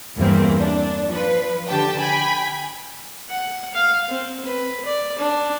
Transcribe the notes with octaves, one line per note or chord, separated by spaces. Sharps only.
E2 G2 E3 A#3 C4
D4
F3 B4
D3 G4 G5 A5
G5 G#5 B5
F#5
F5
C4
B4
D5
D4